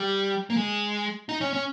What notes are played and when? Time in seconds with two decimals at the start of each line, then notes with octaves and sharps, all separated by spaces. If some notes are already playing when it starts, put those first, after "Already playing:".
Already playing: G3
0.50 A#3
0.56 G#3
1.29 D#4
1.41 C#4
1.53 C#4